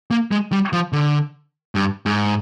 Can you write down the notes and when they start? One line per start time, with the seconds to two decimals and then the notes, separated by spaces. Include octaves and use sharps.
0.11 A#3
0.31 G#3
0.52 G3
0.73 F3
0.93 D3
1.75 G2
2.06 G#2